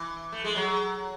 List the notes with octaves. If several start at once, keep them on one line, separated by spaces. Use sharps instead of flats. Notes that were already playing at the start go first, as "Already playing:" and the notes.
Already playing: E3
A3
G#3
F#3